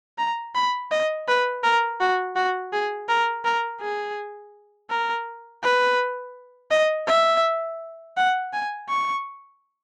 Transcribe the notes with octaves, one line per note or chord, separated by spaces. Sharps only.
A#5
B5
D#5
B4
A#4
F#4
F#4
G#4
A#4
A#4
G#4
A#4
B4
D#5
E5
F#5
G#5
C#6